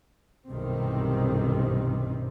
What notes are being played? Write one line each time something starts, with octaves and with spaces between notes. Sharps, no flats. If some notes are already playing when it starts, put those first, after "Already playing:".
F#1 B1 G2 C3 D#3 C4